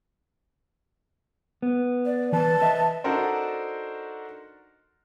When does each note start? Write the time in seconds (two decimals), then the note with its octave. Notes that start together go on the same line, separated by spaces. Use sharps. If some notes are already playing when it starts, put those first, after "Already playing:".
1.62 B3
2.06 D5
2.32 E3 B4 A5
2.62 B4 D#5 E5
3.04 D4 D#4 F#4 A4 A#4 C5